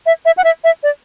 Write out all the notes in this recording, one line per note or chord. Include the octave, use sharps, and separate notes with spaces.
E5
E5
F#5
E5
E5
D5